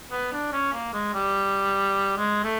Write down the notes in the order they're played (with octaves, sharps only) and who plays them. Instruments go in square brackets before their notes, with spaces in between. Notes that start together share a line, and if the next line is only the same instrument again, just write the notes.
[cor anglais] B3
D4
C#4
A#3
G#3
G3
G#3
A3